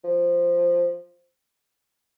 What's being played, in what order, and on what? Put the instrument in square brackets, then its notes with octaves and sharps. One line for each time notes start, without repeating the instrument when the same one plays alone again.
[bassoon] F3